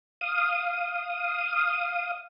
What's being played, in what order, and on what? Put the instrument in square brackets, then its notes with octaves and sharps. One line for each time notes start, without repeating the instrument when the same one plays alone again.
[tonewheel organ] F5 D#6